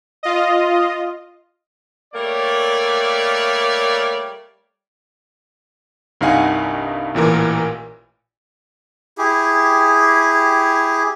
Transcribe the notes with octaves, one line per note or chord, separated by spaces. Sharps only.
F4 D#5
G3 A3 A#3 A#4 C#5 D5
C2 G2 D#4 F5 F#5 G#5
A1 A#2 E3 A#4
E4 G4 G#4